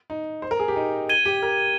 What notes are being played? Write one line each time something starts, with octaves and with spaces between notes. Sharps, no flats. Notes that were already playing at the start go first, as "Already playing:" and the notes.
D#4
C5
A#4
G#4
G4
D#4
G#6 D#7 G7
G4
A#4